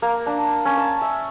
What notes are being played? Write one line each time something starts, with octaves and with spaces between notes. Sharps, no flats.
A#3
D4
C#4
A5
E5